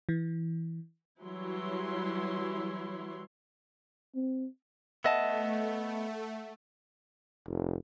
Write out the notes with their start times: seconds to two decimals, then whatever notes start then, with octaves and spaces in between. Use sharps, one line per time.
0.09 E3
1.22 E3 F#3 G3 E4 C#5 C6
4.15 C4
5.04 A3 B3 D#5 E5 F#5 A5 E6
7.47 F1